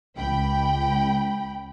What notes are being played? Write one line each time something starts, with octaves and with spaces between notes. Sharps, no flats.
C#2 G5 B5